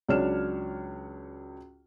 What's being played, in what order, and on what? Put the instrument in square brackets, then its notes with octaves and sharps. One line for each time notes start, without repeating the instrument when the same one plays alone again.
[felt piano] C#2 F#3 D4 C#5 F6 E7